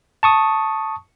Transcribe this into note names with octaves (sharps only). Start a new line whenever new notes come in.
A5 C#6 D#6